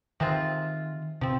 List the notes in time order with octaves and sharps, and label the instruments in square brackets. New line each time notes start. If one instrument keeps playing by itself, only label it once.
[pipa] C3 G#3 C4 F4 [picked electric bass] D#3
[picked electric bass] C3 [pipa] F3 C4